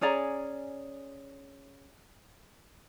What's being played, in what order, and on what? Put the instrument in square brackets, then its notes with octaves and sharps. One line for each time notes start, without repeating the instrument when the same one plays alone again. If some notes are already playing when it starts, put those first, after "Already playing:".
[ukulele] C#4 G#4 D5 A#5